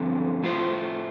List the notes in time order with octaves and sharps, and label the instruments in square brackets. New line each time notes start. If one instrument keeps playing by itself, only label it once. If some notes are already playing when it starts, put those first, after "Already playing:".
Already playing: [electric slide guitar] G2 D3 F3 C4 A4
A2 A3 F4 C5